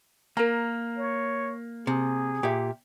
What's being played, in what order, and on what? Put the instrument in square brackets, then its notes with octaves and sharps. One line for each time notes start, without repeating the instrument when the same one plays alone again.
[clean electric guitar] A#3 [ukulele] A#4 A#5
[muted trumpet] C#5
[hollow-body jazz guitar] C3 [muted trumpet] G#4
[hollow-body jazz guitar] A#2 [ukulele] G4 E5